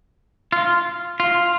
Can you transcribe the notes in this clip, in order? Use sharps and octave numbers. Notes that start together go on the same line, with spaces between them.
F4
F4